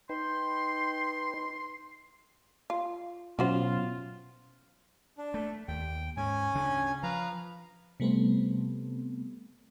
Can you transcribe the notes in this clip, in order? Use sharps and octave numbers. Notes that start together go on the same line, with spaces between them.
D#4 B4 G5 C6
F4
B2 E3 F#3 B3 C#4 F4 F#4 C5
D4
A3
D#2 G5
G#2 C#4 G#5
D2 C#3 D4
F3 B4 F5 A#5
C3 G3 A3 B3 C4